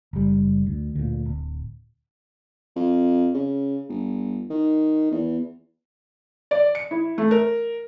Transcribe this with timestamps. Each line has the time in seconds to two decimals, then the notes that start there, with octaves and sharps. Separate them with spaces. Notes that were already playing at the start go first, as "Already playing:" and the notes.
0.13 F#1 G3
0.66 D2
0.95 D2 A#2
1.25 D1
2.76 F2
3.34 C#3
3.89 G1
4.50 D#3
5.11 E2
6.51 D5
6.75 C#7
6.91 E4
7.18 A3
7.31 A#4